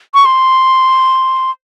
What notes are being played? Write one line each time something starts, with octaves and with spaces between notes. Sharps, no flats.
C#6
C6